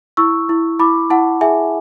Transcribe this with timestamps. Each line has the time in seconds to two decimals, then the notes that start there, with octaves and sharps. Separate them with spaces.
0.17 E4 C#6 E6
0.49 E4
0.79 E4 B5 D6
1.10 E4 F#5 A5
1.41 G#4 E5 G#5